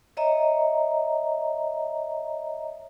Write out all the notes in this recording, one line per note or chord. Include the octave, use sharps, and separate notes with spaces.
C#5 D#5 E5 A#5